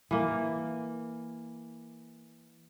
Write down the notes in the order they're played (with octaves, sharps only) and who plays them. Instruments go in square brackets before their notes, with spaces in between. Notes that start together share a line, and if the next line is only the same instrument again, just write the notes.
[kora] E3 A#3